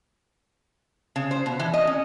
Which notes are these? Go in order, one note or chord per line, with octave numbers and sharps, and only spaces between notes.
C#3
C5
B2
E3
D#5
C#4